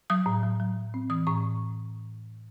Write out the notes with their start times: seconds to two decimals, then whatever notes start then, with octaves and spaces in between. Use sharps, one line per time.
0.10 F#3 D#6
0.26 A2
0.43 F#3
0.60 F#3
0.76 F#3
0.94 C4
1.10 E3 D#6
1.27 A2 C#6